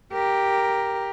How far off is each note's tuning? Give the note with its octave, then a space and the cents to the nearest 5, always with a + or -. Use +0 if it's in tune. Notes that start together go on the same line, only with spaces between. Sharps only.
G4 +0 A#4 +0